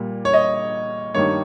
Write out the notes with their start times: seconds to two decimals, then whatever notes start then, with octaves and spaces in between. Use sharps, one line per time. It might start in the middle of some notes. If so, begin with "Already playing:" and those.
Already playing: A#2 G3 A#3
0.25 C#5
0.34 D#5
1.14 G2 D#3 G3 A#3 C#5